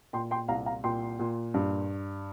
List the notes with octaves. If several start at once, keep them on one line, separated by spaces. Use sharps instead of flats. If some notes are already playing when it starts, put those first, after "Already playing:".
A#2 G5 C6
G5 C6
C2 F5 A#5
F5 A#5
A#2 G5 C6
A#2
G2